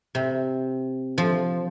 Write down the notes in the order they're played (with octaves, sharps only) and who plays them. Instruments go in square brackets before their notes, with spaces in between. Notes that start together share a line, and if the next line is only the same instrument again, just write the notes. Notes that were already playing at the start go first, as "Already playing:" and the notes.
[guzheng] C3
F3